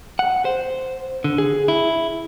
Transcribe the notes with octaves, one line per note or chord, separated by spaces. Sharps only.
F#5
C5
D3
G#4
E4